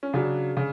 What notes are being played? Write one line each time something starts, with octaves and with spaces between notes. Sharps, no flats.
C#4
C#3 F#3 D4
C#3